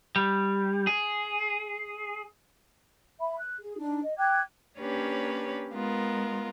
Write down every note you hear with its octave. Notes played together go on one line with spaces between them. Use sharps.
G3
G#4
E5 B5
F#6
G#4
D4 D#4
D#5
G5 D6 F#6 G#6
A#3 C#4 D4 G4 B4 C#5
G#3 B3 F4 A#4